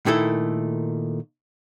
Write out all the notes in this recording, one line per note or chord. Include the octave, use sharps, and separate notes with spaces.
A#2 D#3 A3 E4 A4